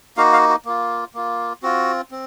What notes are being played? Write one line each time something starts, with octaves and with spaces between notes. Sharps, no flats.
A#3 D#4 F#4 F5
F5
F#4
A#3 F4
A#3 F4
C4 F4 F#4
C4